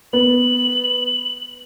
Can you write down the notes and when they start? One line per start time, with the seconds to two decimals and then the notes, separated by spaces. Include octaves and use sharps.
0.13 B3 F#7